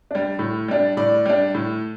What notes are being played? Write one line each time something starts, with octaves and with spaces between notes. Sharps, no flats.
G3 D4
A2
G3 D4
A2 D5
G3 D4
A2